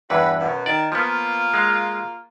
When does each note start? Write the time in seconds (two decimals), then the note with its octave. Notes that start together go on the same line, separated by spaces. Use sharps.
0.10 E2 G2 E3 F#4 B4
0.39 F#2 B2
0.66 D#3 D5
0.92 F3 A#3 B3 F4
1.54 G#3 F5